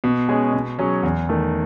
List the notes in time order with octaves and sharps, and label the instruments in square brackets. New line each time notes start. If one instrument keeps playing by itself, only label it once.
[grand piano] B2
G#3 C#4 G#4
B2
F#3 C#4 G#4
E2
D#3 A3